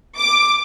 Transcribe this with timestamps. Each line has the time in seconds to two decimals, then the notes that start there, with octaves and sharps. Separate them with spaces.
0.17 D6